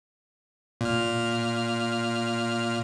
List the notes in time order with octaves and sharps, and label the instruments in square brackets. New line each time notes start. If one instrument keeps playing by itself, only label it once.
[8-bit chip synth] A#2 F6